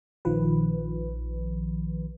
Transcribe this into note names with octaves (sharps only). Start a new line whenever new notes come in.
A#1 D#3 F3 B4